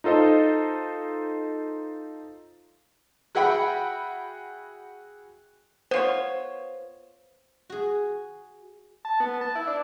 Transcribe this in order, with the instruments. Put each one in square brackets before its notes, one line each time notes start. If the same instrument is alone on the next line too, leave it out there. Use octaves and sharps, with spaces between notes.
[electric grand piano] D#4 F4 A4 C5 D#5
[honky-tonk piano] F#4 G#4 E5 F#5 G5 B5
[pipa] B3 F4 C#5 [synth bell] C5
[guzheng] F#4 G#4
[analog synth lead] A5
B3
A5
E4
D4